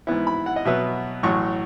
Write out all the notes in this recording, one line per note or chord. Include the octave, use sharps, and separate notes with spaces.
G#2 E3 B3 E4
B5
F#5
D#5
B2 F#3 B3 E5
A1 A2 F#3 C#6